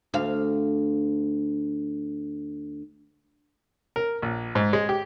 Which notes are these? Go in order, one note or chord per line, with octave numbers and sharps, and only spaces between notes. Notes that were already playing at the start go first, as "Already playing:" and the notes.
D2 F5
A#4
A#1
G#2
G#3
G4